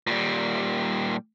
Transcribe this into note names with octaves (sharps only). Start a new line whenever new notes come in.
A#2 G3